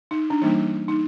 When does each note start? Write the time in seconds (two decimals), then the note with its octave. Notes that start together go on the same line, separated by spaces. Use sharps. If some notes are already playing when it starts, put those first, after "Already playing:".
0.11 D#4
0.30 D4
0.42 E3 G3 A#3 D#4
0.88 D#4